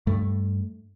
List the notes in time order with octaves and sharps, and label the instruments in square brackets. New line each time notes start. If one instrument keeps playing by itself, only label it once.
[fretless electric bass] G2 A3